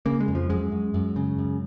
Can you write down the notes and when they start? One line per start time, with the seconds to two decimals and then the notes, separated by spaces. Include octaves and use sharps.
0.06 C#3 A#3
0.20 G#3
0.28 F2
0.35 F3
0.50 F#2 G#3
0.72 F#2
0.94 F#2
1.16 C#3
1.39 F#2